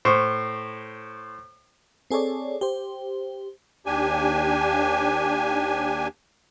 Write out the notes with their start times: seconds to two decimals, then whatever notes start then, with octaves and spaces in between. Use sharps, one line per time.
0.05 A2 C5 C#6
2.11 C4 G#4 A4 C#5 D5
2.61 G4 C5
3.86 D#2 D4 G4 G#5